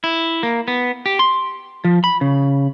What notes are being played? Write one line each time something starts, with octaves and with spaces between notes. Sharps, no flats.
E4
A#3
B3
G4
C6
F3
B5
C#3